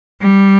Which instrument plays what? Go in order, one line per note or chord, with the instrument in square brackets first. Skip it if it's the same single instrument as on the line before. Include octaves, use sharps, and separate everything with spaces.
[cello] G3